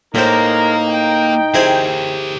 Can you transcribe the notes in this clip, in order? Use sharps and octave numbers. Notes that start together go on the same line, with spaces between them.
A2 G#3 A#3 D#4 A#4 C5
G5
C4 E4 G4 G#4 A#4